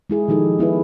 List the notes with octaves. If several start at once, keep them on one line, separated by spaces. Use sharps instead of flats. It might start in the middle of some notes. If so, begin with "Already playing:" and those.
G#3 E4 G#4
D#3 F3 D#4 G4 A4
B3 E4 G#4 B4